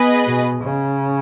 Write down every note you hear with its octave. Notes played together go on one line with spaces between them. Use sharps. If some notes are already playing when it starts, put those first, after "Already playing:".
Already playing: B3 G#4 B4 D#5
B2
C#3